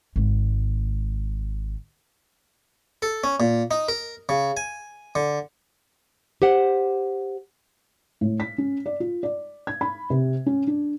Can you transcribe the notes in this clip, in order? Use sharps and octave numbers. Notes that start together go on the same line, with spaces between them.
G#1 G#3
A4
C#4
A#2
D#4
A#4
C#3
G#5
D3
G4 C5 F#5
A2
B6
C#4
D5
F4
D5
G#6
B5
C3
C#4
D4